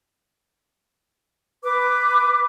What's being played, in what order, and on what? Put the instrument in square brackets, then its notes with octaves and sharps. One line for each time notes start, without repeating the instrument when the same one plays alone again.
[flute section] B4 D6